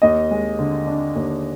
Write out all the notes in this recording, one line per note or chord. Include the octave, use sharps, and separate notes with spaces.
D#2 D#5
G#3
D3
D4
D#2